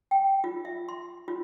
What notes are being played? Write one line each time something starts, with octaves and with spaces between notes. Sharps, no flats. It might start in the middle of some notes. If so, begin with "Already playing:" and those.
G5
F4
E5
C6
F4